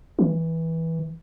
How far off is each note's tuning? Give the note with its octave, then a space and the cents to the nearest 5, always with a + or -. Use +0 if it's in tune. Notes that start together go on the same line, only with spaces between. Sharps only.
E3 -15